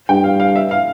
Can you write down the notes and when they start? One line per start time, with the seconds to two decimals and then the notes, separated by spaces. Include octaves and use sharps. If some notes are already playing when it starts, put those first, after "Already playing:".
0.09 G2 G5
0.24 F5
0.40 F5
0.56 E5
0.71 F5